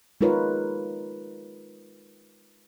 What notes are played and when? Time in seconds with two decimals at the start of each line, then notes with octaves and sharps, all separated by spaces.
0.21 G#3 D#4 F4 A#4 B4 C#5